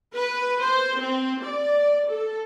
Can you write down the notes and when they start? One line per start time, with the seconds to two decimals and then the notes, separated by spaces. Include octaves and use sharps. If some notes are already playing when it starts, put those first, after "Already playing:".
0.14 B4
0.61 C5
1.01 C4
1.44 D5
2.09 A4